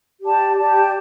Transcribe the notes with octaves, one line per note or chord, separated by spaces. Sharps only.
G4 D5 A5
G4 D5 A5